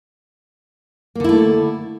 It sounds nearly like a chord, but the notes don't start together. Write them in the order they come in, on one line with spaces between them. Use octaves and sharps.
A#3 D3 E4 A3